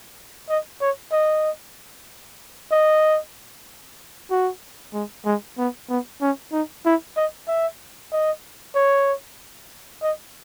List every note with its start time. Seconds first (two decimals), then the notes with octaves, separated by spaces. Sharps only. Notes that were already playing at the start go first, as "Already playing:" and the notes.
0.49 D#5
0.81 C#5
1.12 D#5
2.72 D#5
4.31 F#4
4.94 G#3
5.26 G#3
5.58 B3
5.90 B3
6.22 C#4
6.52 D#4
6.85 E4
7.17 D#5
7.48 E5
8.12 D#5
8.75 C#5
10.02 D#5